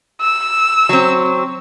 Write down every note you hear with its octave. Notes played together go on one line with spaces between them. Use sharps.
E6
F#3 C4